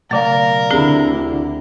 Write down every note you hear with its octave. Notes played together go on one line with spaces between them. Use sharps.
B1 C#3 A3 A#4 D5 F5
D2 D3 C4 E4 G4 G#4